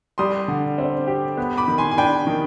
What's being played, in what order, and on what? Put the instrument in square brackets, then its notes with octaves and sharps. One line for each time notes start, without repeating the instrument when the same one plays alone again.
[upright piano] G3 [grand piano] C6 D#6
[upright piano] D3
C4
G4
B3
[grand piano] B5 D6
[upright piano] D#3
[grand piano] G#5 C6
G#5
[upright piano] D4 [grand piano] G5 B5
[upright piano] D#3